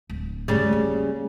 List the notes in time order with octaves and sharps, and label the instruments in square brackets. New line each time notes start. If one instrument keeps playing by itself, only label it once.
[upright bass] D1
[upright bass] G2 A3 [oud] C#3 G3
[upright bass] A#3